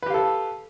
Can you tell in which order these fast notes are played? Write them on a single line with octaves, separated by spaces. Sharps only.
B4 G4 F5 A4